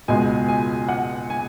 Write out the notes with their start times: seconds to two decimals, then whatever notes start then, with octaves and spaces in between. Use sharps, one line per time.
0.08 C#2 B2 G#3 B3 G#5
0.48 G#5
0.89 F#5
1.30 G#5